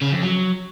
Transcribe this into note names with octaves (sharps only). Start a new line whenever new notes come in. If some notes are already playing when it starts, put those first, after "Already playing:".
C#3
F2
F#3